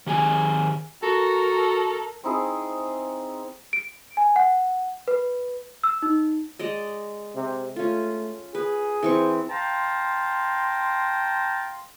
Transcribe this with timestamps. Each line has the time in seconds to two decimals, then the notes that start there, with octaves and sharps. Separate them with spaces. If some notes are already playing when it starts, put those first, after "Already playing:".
0.06 D#3 G4 G#4 G#5
1.03 F#4 A4 A#4
2.23 C4 D#4 E4 G#4
3.73 D7
4.17 G#5
4.36 F#5
5.08 B4
5.84 E6
6.02 D#4
6.59 G#3 D5 D#5
7.36 C3
7.76 A3 C#4 F4
8.55 G#4 B4
9.03 E3 C4 C#6
9.49 F5 G5 A5 A#5 C6